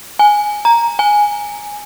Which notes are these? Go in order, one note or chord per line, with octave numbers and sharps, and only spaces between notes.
G#5
A#5
G#5